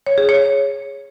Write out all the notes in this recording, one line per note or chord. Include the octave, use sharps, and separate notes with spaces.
C#5
G#4
C#5